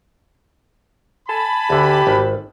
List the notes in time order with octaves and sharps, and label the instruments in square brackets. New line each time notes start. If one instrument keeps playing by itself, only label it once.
[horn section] G#5 A5 B5
[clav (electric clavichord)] D2 D3 [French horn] G4
[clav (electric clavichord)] G#1